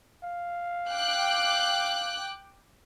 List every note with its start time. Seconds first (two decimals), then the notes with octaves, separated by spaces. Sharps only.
0.24 F5
0.90 G5 D6 F#6